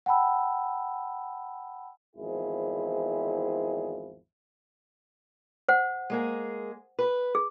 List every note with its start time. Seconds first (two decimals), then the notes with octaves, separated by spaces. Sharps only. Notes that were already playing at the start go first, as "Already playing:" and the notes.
0.06 F#5 G5 A5 B5 E6
2.16 G#1 E2 F3 E4 G#4
5.68 C5 F#5
6.10 G#3 A#3 G#4
6.99 B4
7.35 G#4